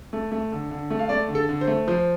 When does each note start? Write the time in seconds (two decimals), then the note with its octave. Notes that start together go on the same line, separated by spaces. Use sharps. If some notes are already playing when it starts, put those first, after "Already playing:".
0.13 A3
0.32 A3
0.52 D3
0.71 D3
0.90 A3
0.99 F5
1.09 A3 D5
1.29 D3
1.35 A4
1.49 D3
1.61 C5
1.67 A3
1.88 F3 C5